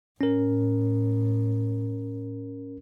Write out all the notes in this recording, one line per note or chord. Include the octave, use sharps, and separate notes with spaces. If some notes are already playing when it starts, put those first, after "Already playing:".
A2 C#4 A#4